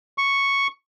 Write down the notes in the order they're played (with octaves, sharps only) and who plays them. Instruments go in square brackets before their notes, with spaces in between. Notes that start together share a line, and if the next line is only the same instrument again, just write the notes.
[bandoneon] C#6